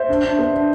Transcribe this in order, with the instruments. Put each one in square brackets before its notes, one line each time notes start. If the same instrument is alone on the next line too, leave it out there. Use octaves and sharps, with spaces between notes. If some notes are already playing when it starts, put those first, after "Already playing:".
Already playing: [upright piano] C5 E5
D4
D4
B3
D4